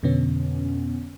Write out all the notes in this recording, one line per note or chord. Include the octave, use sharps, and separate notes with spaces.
F2 B2 D3 B3 C#4